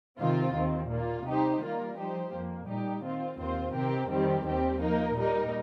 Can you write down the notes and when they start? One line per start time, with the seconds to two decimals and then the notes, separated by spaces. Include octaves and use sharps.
0.19 C3 D#3 C4 F4
0.55 D#2 D#3 C4
0.90 A#2 A#3 F4
1.26 C3 G3 D#4 G4 C5
1.62 D#3 G3 A#3 F4 A#4
1.96 F3 D#4 G4 C5
2.33 F2 F3 A#3
2.67 A#2 G3 D#4 G4
3.04 D#3 C4 F4
3.39 D#2 D#3 C4 F4 C5
3.74 C3 D#3 C4 G4 A#4
4.10 F2 D#3 G3 C4 G4
4.45 D#2 D#3 G3 C4 G4
4.81 F3 A#3 D#4 A#4
5.16 A#2 G3 D#4 A#4